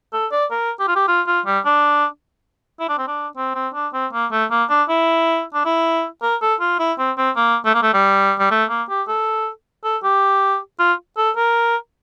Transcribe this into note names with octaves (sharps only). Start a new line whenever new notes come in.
A4
D5
A#4
G4
F4
G4
F4
F4
G3
D4
E4
D4
C4
D4
C4
C4
D4
C4
A#3
A3
A#3
D4
E4
D4
E4
A#4
A4
F4
E4
C4
C4
A#3
A3
A#3
A3
G3
G3
A3
A#3
G4
A4
A4
G4
F4
A4
A#4